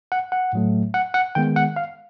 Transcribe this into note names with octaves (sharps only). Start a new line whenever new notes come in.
F#5
F#5
A2 F#3 A3
F#5
F#5
D#3 G#3 B3 G5
F#5
F5